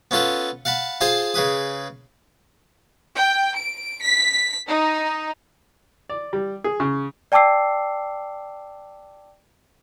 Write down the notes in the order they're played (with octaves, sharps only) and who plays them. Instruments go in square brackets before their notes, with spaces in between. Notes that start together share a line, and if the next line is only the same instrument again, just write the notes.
[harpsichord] B3 C#4 F4 A4 B4
F5 F#5 A5 B5
F4 G#4 C5 F5 G#5 A5
C#3 G#4 B4 D#6
[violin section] G5
D7
B6
D#4
[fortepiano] D5
G3
G#4
C#3
[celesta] D5 G5 A5 D6 E6 C7